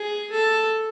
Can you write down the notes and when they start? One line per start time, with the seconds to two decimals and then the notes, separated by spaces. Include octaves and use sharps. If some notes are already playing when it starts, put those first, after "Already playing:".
Already playing: G#4
0.31 A4